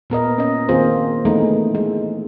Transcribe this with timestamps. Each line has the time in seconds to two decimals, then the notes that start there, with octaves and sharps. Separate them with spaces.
0.10 A#2 B3 A#4 D#5
0.38 C#4 D#5
0.68 D#3 A#3 C4 F4 G#4 C5
1.25 E3 G#3 A3 B3 D#4
1.75 G#3